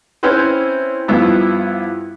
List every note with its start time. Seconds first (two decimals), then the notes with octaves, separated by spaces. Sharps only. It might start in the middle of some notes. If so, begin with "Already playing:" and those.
0.23 C4 C#4 E4 B4 C5
1.08 G2 F3 B3 E4